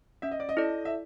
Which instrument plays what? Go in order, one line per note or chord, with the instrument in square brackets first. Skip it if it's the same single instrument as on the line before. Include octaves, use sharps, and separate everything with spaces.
[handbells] C#4 [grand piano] E5
[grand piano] D#5
D5
D#5
[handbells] E4 A4 D5
[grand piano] E5